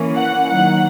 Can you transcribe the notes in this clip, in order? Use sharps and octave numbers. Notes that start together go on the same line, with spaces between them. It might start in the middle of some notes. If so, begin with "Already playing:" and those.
Already playing: E3 A#3 C#4
F#5
D#3 F#3 A#3 F#5